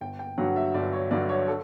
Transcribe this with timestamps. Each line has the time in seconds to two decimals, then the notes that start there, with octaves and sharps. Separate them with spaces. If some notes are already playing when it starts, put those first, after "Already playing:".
0.01 G1 G5
0.19 G5
0.38 G2 D3 F#3 F#5
0.56 E5
0.74 G1 D5
0.93 C#5
1.11 G2 D3 F#3 D5
1.29 C#5
1.48 A4